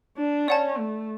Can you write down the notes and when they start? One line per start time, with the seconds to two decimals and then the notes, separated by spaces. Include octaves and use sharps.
0.17 D4
0.47 C#4 D5 F#5 A5
0.79 A3